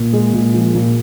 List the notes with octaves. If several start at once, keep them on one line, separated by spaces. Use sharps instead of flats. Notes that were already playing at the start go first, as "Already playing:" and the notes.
Already playing: A#2
G#3
A#2
F3
A#2